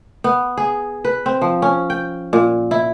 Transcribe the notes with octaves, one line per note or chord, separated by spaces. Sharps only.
B3
G#4
B4
C4
F3
C#4
G5
A#2
E4